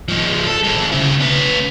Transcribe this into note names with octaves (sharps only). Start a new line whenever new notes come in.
F3 G#3
A4
G#3 C4
C#3 E4
C#4 B4